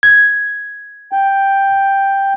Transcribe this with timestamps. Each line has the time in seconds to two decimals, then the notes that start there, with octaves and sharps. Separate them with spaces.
0.03 G#6
1.12 G5